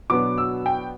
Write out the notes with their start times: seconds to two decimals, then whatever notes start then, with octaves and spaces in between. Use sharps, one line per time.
0.10 B2 F#3 B3 D4 D6
0.38 E6
0.66 G5